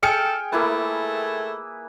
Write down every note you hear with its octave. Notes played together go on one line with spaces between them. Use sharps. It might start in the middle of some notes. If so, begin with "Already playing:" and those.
G#4 A4 G5 F6 C#7
A3 A#3 E4 B4